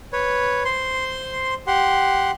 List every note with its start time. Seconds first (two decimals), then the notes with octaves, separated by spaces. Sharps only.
0.13 B4 C#5
0.65 C5 C6
1.67 G4 F#5 C6